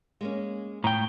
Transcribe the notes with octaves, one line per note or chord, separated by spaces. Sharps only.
G#3 A#3 C#4
A2 G5 A#5